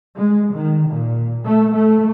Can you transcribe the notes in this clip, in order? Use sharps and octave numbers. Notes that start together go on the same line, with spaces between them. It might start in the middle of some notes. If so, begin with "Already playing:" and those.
G#3
D#3
A#2
A3
A3